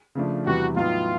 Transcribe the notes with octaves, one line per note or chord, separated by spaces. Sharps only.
C#3 F3 A3 D4
E2 C3 E3 G3 F#4
A2 F#3 B3 D#4 F4